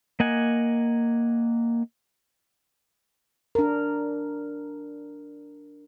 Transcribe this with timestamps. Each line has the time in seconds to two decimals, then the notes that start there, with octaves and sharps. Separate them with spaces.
0.20 A#3 D#5 F#5 G#5
3.55 D4 A#4